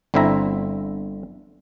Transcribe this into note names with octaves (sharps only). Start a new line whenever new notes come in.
G1 D3 C4 E4 E5 A#5